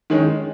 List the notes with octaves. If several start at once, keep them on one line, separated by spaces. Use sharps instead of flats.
D#3 G#3 C#4